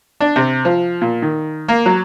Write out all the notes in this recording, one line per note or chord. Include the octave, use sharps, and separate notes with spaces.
D4
C3
F3
A#2
D#3
A#3
F#3